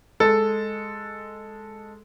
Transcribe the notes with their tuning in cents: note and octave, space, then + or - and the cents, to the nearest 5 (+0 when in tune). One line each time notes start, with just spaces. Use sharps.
G#3 +0 A4 +0